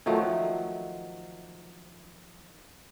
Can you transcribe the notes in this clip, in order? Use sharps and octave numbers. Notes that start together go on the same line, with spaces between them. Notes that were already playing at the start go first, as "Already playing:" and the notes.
D#3 F3 F#3 A3